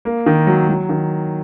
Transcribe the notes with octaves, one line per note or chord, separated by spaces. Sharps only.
A#3
D#3
F#3
F#3
D#3